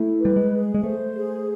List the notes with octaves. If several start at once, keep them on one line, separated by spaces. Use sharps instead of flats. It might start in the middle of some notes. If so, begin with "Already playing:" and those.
Already playing: A3 E4
G3 B4
G#3
G#4
G#3
A3 C5
G#4